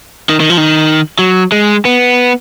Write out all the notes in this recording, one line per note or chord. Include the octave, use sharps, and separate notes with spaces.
D#3
D#3
F3
D#3
F#3
G#3
B3